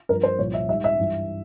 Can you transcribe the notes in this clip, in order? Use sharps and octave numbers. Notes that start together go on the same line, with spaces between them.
G2 F3 A#4
C5
C2 A#2 F3 C#5
E5
G#2 G3 E5
E5
G2 E3 G3